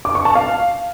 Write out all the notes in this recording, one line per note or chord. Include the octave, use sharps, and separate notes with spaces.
D6
C#6
A5
F5